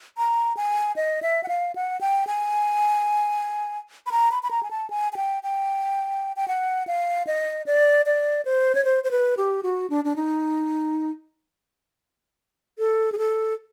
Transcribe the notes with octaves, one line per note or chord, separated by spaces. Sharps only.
A#5
G#5
D#5
E5
F#5
F5
F#5
G5
G#5
B5
A#5
B5
B5
A#5
G#5
A5
G#5
G#5
G5
G5
G5
F#5
F5
D#5
D5
D5
C5
C#5
C5
C5
B4
G4
F#4
D4
D4
D#4
A4
G#4
A4